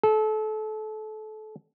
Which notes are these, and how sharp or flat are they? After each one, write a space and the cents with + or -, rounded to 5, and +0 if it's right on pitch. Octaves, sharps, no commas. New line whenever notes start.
A4 -30